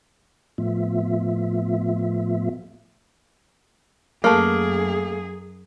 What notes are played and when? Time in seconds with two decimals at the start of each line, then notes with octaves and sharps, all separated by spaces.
0.58 A2 F3 A3 B3 F4 E5
4.24 F#2 A3 A#3 G#4